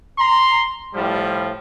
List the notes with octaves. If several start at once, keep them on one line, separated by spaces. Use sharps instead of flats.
A#5 C6
A2 F3 G3